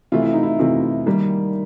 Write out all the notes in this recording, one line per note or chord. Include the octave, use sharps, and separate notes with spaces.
C3 E3 A3 F4
E4
D#4
E4
C3 E3 A3 F4
D#3 G3 A#3